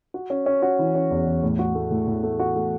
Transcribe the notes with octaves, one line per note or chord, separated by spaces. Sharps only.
F#4
C#4
C#4
F#4
E3
C#4
E2
E2
A2
F#4
A3
A2
A2
A3
F#4
A3